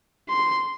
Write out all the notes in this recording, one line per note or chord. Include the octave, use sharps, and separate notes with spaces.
C6